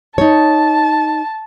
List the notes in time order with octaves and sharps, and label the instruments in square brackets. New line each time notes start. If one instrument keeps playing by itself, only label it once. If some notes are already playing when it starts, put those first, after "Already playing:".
[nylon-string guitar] D#4 C#5 [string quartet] A5